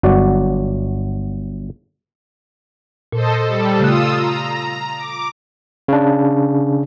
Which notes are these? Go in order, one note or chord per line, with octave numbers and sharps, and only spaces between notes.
G1 F#3 F#4 D5
A#2 A4 C5 D#5
G3 A4
C#3 A3 F4 D#6 E6 F#6
A#5
D6
C#3 D4